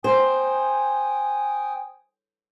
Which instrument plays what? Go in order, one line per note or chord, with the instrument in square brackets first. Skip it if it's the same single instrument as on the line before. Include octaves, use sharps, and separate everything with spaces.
[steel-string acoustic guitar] C5 [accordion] G5 G#5 D#6